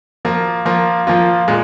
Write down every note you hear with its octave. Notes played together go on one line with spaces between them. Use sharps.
F3 A#3 F4
F3 A#3 F4
F3 A#3 F4
A#2 G#3